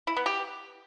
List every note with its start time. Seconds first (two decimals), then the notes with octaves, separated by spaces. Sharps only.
0.07 E4
0.17 B3
0.26 G4